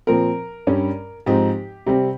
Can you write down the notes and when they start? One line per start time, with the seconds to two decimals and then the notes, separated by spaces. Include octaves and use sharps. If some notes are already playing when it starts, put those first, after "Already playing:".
0.07 A#2 F3 C4 A#4
0.67 G2 G3 C#4
1.26 G#2 F3 C4 D#4 G4
1.86 C3 G3 C4